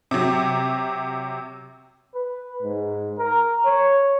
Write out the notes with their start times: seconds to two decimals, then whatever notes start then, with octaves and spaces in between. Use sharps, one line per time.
0.11 C3 F#3
2.15 B4
2.63 G#2
3.19 A#4
3.65 C#5